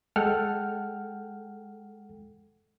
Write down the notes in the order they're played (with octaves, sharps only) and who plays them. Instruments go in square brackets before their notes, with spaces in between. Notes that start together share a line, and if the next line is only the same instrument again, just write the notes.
[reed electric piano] G#3 A4 F#5 G5 F6